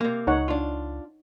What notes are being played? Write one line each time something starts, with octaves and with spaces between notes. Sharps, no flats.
C3 A#3
C#2 D#4 C#5 F#5
D4 F4